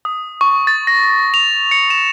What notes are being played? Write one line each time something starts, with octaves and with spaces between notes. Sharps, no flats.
D#6
C#6
A6
A#6
F7
C#7
E7